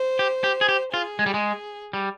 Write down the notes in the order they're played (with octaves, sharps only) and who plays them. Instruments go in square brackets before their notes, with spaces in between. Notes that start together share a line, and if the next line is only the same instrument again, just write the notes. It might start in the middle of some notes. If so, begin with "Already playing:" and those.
Already playing: [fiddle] C5
[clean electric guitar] G4
G4
G#4
G4
[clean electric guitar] F4 [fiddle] G#4
[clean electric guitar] G#3
G3
G#3
G3